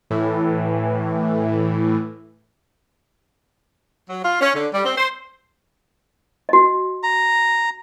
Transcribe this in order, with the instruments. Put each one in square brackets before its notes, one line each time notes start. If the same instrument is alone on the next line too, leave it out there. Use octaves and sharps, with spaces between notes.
[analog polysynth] A2 E3
[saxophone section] F#3
F4
C#4
D3
G3
C4
C5
[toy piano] F#4 D#5
[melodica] A#5